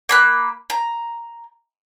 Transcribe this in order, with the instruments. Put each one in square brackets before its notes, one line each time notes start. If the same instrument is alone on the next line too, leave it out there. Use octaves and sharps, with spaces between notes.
[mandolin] A#3 B5 F#6
A#5